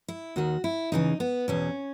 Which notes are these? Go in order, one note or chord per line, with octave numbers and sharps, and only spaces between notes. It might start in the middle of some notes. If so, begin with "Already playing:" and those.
E4
D#2 D#3 F#4
E4
E2 C#3 E3 D#4
B3
E2 B2 C#4